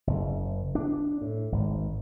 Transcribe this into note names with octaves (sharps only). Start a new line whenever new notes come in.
F#1
D4
A2
G#1